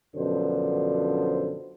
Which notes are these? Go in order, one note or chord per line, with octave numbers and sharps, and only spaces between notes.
F#2 B2 D3 F3 D4 C5